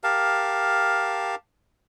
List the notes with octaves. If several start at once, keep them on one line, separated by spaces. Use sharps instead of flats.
G4 A#4 F5 A5